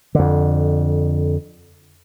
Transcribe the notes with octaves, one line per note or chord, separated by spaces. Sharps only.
F2 D3